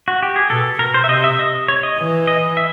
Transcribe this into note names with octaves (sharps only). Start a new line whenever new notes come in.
F#4
G4
G#4
B2 A4
B2 A#4
C5
E5
C3 D#5
E5
D#5
C#5
D#5
E3
D#5
E5